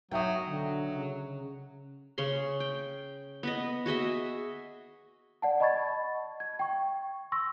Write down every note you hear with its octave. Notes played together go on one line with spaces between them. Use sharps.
B1 F#3 D#5 E5 G5
D3 F#3
C#3
C#3 C#4 C6
G5
B3 B4 D#5
F#4 G#4 D#5 E5
D5 F#5 A5
D#5 A5 B5 C#6 G#6 A6
G#6
G5 C#6
C6 C#6 E6 A#6